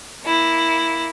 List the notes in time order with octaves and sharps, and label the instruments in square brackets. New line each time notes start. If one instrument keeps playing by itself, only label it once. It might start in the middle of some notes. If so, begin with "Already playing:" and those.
[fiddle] A#3 E4